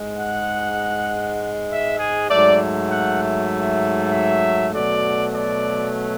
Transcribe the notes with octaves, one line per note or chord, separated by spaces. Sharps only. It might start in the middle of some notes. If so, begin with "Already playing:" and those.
Already playing: G#2 G#3
F#5
E5
G#4
G#2 F#3 A3 D5
F#5
E5
E5
B2 F#3 A3 D5
D5